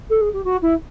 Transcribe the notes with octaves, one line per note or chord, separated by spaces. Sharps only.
A4
G#4
G4
F#4
E4